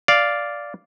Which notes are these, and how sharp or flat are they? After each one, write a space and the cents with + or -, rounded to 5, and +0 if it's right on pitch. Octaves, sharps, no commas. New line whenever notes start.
D5 -5 F5 +0